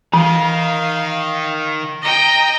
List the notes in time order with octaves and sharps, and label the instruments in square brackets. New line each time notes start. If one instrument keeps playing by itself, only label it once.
[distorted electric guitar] D#3 [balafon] E3 [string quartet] F5
[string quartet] D#5 G5 A#5